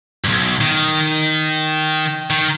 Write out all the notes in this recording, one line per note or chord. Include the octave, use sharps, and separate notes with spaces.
B1 G2
D#3
D#3